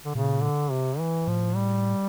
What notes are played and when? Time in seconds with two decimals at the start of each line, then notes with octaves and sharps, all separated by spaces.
0.05 D3
0.15 A#2 C#3
0.43 D3
0.71 C3
0.99 E3
1.27 A2 F3
1.56 G3